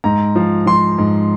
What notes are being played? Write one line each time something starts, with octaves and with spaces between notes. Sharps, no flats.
G#2 A#5
F3
F3 C6
G#2